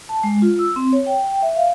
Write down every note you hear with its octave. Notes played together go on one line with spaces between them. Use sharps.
A5
G#3
F4
E6
C4
C#5
G5
G5
E5
F5